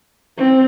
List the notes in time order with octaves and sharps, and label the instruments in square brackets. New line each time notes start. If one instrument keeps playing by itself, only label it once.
[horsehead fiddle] C4